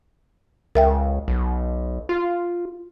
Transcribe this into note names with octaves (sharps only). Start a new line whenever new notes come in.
C#2 A#4 E5 G5
B1
F4